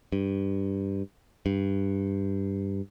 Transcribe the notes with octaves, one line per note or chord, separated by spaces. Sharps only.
G2
G2